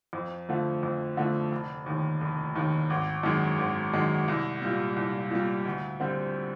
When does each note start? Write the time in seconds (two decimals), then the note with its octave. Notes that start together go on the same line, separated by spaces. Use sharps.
0.13 F2
0.49 D3 F3 A3
0.83 F2
1.17 D3 F3 A3
1.52 F1
1.86 D#2 D#3
2.21 F1
2.55 D#2 D#3
2.90 G#1
3.23 F#2 D#3 G#3
3.58 G#1
3.93 F#2 D#3 G#3
4.28 C2
4.62 A#2 G3
4.96 C2
5.31 A#2 G3
5.65 D2
6.00 D3 G3 C4